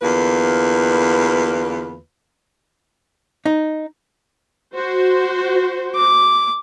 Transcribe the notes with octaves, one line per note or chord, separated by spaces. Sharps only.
E2 D3 A#3 F4 B4
D#4
F#4 C5
D6